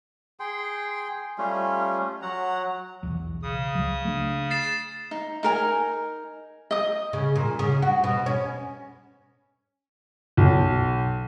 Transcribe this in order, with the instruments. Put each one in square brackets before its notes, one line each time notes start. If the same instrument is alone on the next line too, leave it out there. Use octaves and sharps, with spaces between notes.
[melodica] G#4 G5 C6
G3 A3 C#4 F4
F#3 F#5 A#5
[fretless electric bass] B1 E2
[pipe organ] C#3 D#6
[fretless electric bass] C#2 F#3
A3 D4
[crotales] A6 C7 E7
[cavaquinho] D#4
D#4 A#4 G#5
D#5 D#6
[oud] C#3
A#2
C#3
F#4
B2
C#4
[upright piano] B1